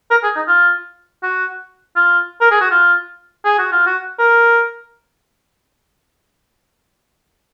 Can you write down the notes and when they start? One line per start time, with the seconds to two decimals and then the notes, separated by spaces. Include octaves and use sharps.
0.11 A#4
0.23 G#4
0.36 D#4
0.48 F4
1.23 F#4
1.96 F4
2.41 A#4
2.51 G#4
2.61 F#4
2.71 F4
3.45 G#4
3.59 F#4
3.72 F4
3.87 F#4
4.19 A#4